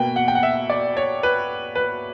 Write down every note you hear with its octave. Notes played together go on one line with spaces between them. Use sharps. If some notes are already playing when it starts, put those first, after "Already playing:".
Already playing: B2 A#3 B4 G5
F#5
G5
F#5
E5
D5
C#5
B4
B4